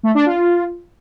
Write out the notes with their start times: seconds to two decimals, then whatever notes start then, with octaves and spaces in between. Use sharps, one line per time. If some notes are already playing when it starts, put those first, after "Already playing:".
0.03 A3
0.15 D4
0.26 F4